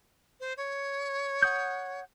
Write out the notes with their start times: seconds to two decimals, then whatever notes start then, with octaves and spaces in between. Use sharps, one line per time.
0.40 C5
0.57 C#5
1.42 F#5 D#6 G6